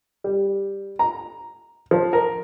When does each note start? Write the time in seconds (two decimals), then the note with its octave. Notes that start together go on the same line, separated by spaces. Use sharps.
0.24 G3
0.99 A#5
1.91 F3
2.13 A#4